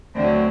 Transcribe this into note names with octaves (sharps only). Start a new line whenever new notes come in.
D2 D3 F#3 A3 C4